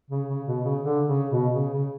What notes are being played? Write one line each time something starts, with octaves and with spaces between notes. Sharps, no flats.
C#3
C#3
B2
C#3
D3
C#3
B2
C#3
C#3